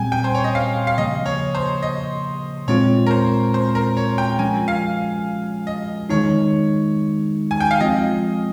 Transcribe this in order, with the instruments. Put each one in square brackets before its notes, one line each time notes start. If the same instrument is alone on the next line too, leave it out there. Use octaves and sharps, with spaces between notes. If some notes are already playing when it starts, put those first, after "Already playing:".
Already playing: [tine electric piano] A#2 G3 C4 [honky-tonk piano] G5 G#5
[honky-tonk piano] G5
C5
C#5
D#5
F5
F5
[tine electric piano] C#3 F3 A#3 [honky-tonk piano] D#5
[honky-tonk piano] C#5
C5
D#5
[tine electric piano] A#2 G#3 C4 F4 [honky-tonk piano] C#5
[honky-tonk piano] A#4
C5
C5
A#4
C#5
G5
[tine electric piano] F3 G#3 C#4 F4 [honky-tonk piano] G#5
[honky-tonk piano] F5
D#5
[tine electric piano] D#3 G#3 D#4 [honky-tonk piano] C#5
[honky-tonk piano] G#5
G5
F5
[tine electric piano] F3 G#3 C4 F4 [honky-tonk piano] D#5